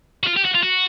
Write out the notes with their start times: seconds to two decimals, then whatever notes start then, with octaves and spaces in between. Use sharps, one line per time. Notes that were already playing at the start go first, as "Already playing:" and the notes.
0.24 F#4
0.27 F4
0.37 G4
0.45 F#4
0.55 F4
0.63 F#4